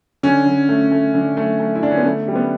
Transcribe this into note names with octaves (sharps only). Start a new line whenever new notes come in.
D3 C#4
D3
A3
A3
D3
A3
A3
E4
D3 D4
C#4
B3
D3 A3
G3
B3